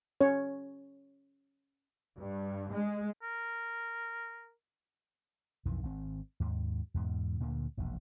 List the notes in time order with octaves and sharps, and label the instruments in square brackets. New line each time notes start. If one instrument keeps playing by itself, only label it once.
[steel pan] C#4 C#5
[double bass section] G2
G#3
[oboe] A#4
[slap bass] B1 F2 D#3 E3
G#1 C4
D#2 G#2
E2 G#2 B2
D2 A#2 D3 A#3
E1 A#1 D#2